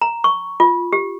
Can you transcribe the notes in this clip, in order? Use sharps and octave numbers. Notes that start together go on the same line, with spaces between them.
A#5
C#6
F4
G4